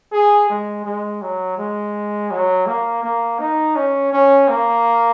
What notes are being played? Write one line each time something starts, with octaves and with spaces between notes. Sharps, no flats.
G#4
G#3
G#3
F#3
G#3
F#3
A#3
A#3
D#4
C#4
C#4
A#3